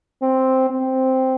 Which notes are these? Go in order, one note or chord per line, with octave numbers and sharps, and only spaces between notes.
C4
C4